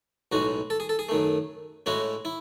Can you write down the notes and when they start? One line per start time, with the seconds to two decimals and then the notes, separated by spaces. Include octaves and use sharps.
0.32 B1 A2 G#3 F#4
0.70 A4
0.80 G#4
0.89 A4
0.99 G#4
1.09 F#2 D#3 A3
1.86 A2 G#3 C#4 E4 F#4
2.25 E4